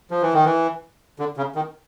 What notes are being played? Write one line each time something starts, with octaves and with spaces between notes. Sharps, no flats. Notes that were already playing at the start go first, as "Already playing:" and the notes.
F3
E3
D#3
E3
D3
C#3
D#3